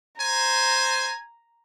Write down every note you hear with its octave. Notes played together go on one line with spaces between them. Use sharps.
C5 G#5 A#5